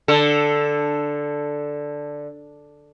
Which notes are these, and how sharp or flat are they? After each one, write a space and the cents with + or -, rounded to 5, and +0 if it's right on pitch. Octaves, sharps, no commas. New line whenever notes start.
D3 +0 A4 +0